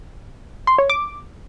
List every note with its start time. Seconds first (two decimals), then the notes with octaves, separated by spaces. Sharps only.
0.67 C6
0.78 C#5
0.90 D6